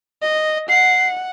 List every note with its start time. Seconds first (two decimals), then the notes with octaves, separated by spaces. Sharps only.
0.22 D#5
0.69 F#5 C7